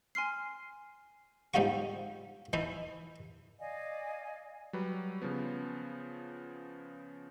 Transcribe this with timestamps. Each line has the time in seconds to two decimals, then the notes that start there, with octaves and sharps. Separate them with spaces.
0.15 G#5 C6 F6 C7
1.54 G#2 G3 D#4 F4 F#4 C#6
2.53 E3 D#4 E4
3.59 D5 D#5 F5 G#5
4.73 F#3 G3 B4
5.22 C#3 F3 B3